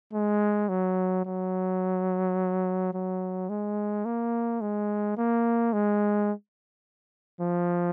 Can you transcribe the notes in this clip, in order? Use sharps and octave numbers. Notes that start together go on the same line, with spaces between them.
G#3
F#3
F#3
F#3
G#3
A#3
G#3
A#3
G#3
F3